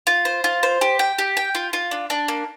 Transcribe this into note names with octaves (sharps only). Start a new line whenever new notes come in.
F4
C5
F4
C5
G4
G5
G4
G5
F4
F4
D4
D4
A#3